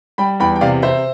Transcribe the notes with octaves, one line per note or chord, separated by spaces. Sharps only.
G3 G5 B5
E2 G5 B5
G5
C3 D5 F5
C3 C5 E5